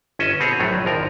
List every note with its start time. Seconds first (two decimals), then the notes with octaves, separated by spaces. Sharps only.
0.19 G1 C#4 D#5 E5
0.40 B2 C4 G#4 C#5
0.59 A#1 F#2 A2 F#3 G3 A3
0.85 G#1 F2 F3 A#4